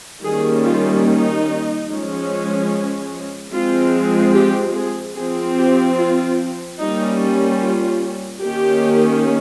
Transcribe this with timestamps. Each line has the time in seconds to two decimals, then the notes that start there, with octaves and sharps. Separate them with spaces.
0.24 D#3 G3 A#3 C#4 G#4
0.65 F4
1.06 D#4
1.88 F3 G#3 C#4
3.52 F3 G#3 C4 F4
4.34 G4
4.75 G#4
5.16 F3 C4 G#4
5.58 G4
5.98 F4
6.80 G3 A#3 C#4 D#4
7.62 F4
8.44 D#3 A#3 C#4 G4